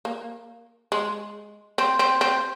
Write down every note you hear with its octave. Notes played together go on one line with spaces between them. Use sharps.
A#3
G#3
C4
C4
C4